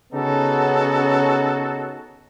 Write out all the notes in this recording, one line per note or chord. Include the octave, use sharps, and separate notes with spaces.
C#3 B3 C#4 D#4 F#4 A4